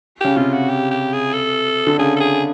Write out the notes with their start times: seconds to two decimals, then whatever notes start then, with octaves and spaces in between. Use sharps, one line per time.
0.21 C#3 G4
0.36 C3 F4
0.53 F#4
0.69 G4
0.91 G4
1.13 G#4
1.33 A4
1.87 D3
1.98 C#3 G#4
2.16 A4
2.20 G#4